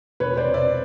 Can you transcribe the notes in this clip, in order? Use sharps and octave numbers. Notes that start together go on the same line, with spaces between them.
E1 B4 C#5
C5 D5
C3
D5 E5